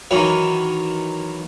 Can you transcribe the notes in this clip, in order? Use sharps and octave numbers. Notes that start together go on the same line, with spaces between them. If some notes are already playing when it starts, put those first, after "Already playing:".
D#3 E3 F#3